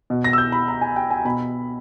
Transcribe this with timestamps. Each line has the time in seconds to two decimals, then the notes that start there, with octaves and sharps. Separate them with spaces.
0.10 B2
0.24 A#6
0.33 E6
0.38 G6
0.52 B5
0.68 A#5
0.81 G#5
0.96 G5
1.11 G#5
1.25 B2 B5